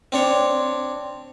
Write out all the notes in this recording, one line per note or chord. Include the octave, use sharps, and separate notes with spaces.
C4 D4 C#5